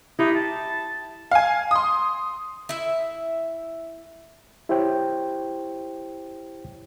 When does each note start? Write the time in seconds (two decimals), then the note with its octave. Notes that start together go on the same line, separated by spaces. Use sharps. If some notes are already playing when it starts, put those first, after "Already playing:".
0.19 D#4 E4 G4
0.35 A5
1.31 F5 G#5
1.71 C6 D#6
2.69 E4 E5
4.69 E4 G4 C5 C#5 G5